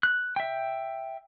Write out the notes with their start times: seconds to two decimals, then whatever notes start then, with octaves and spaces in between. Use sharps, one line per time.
0.03 F#6
0.36 E5 G5